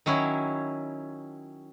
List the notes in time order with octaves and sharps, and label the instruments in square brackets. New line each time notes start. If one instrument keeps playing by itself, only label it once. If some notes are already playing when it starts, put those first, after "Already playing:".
[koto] D#3 F#3 C#4 E4